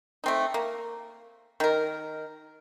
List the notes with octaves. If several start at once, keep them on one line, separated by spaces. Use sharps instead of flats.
A3 C4 D#4
A#3
D#3 A#4